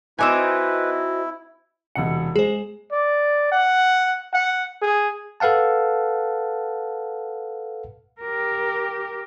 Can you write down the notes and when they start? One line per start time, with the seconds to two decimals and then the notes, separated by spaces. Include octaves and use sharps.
0.19 C4 D#4 E4 F#4 B4 G#5 D6 E6
1.95 E1 C3 F#5 C#7
2.36 G#3 G#4 C5
2.92 D5
3.52 F#5
4.34 F#5
4.82 G#4
5.40 A4 B4 F5 F#5 A5
8.22 G4 A#4